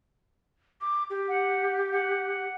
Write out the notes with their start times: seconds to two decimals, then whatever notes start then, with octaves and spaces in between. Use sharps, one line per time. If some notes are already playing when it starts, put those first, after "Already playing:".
0.81 D6
1.10 G4
1.28 F#5
1.91 F#5